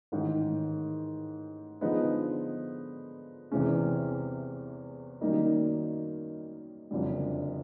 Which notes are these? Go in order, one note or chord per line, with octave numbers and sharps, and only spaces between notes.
A1 G#2 D#3
D3 F3 G#3 B3 D#4
E2 C3 E3 G#3 C#4
F#2 D#3 G3 A#3 D#4
F#1 F2 D3 G3